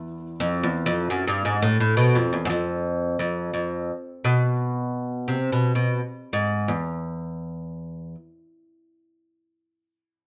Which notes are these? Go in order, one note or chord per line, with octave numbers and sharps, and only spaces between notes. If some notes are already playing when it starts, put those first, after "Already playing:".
Already playing: E2
F2
E2
F2
F#2
G2
G#2
A2
A2
B2
F2
E2
F#2
F2
F2
F2
B2
C3
B2
B2
G#2
E2